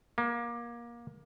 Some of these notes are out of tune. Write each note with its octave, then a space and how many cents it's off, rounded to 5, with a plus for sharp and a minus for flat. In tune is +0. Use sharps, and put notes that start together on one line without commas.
A#3 +25